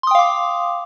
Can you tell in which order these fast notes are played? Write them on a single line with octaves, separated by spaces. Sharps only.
C6 D#6 G5 F5 D6